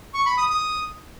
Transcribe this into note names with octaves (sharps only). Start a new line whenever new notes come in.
C#6
B5
D#6
D#6